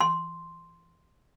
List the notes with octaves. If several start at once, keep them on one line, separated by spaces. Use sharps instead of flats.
C6